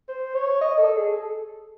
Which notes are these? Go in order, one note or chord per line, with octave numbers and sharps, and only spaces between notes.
C5
C#5
D#5
A4
G#4
A4